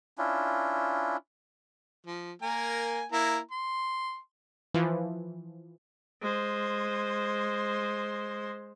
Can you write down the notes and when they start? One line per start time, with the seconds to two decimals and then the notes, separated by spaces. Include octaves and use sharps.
0.18 C#4 D4 E4 F4
2.07 F3
2.42 A#3 A#4 G#5
3.12 A#3 E4 A#5
3.51 C6
4.74 E3 F3
6.21 G#3 C5